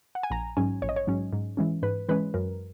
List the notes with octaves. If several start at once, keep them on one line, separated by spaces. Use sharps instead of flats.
F#5
G#5
A#1 A#5
G#2 F#3 C#4 G#5
A#1 C#5
D#5
C#5
G#2 F#3 C#4
G#2
E3 G#3 C#4
G#2 B4
E3 G#3 C#4 B4
F#2 A#4